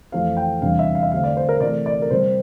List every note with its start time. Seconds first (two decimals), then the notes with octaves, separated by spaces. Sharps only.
0.12 F2 E3 A3 C4 F5
0.37 G5
0.62 E2 C3 G3 D4 F5
0.79 E5
0.95 F5
1.03 E5
1.12 D3 A3 C4 F5
1.24 D5
1.37 C5
1.49 A#4
1.60 C3 E3 A3 D5
1.86 D5
2.02 A#4
2.10 C3 G3 C4 C5